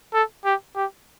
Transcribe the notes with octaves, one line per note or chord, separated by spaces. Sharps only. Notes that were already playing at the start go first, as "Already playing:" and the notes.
A4
G4
G4